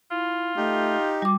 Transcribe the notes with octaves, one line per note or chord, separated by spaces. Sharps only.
E4 F4
A3 D#4 G4
G3 F#4 D6